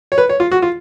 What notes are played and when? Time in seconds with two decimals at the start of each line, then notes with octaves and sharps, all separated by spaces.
0.12 C#5
0.18 B4
0.29 C#5
0.40 F4
0.52 F#4
0.62 F4